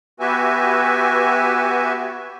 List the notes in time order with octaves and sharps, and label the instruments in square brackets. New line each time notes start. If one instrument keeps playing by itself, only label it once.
[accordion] B3 F#4 G4 B4 E5 G#5